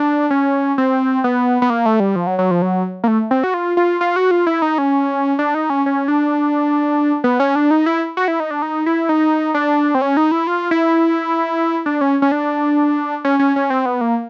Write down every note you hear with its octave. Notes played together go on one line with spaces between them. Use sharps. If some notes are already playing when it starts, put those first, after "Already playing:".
Already playing: D4
C#4
C4
B3
B3
A#3
A3
G3
F3
F#3
F#3
F3
F#3
A#3
A3
C4
F#4
F4
F4
F4
F#4
F4
E4
D#4
C#4
D4
D#4
C#4
C#4
D4
B3
C#4
D4
D#4
E4
F#4
E4
D#4
D4
D#4
E4
D#4
D4
C4
C#4
D#4
E4
F4
E4
D4
C#4
C#4
D4
C#4
C#4
C#4
C4
B3
A#3